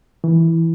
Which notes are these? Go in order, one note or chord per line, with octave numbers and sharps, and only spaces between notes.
E3